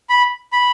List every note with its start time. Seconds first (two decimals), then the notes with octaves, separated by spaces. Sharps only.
0.09 B5
0.52 B5